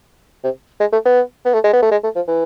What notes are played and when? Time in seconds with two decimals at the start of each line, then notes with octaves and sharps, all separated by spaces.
0.44 C3
0.80 G#3
0.93 A3
1.05 B3
1.45 B3
1.54 A3
1.64 G#3
1.73 B3
1.82 A3
1.91 G#3
2.04 A3
2.16 F3
2.28 E3